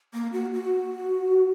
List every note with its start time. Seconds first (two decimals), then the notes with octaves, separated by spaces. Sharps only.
0.14 A#3
0.33 F#4
0.53 F#4